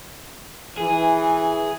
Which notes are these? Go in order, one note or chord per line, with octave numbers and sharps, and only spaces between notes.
E3 G#4